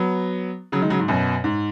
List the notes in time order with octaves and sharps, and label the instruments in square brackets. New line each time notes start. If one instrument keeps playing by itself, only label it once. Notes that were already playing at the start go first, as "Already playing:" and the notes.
Already playing: [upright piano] F#3 B3
C#3 F#3
D#3 G#3
C#3 F#3
G#2
F#2 B2
G#2